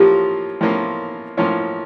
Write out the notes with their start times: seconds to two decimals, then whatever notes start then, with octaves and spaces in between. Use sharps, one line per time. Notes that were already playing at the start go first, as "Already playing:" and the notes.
Already playing: A2 F3 A#3 C#4 F4 G4
0.61 A2 F3 A#3 C#4 F4
1.37 A2 F3 A#3 C#4 F4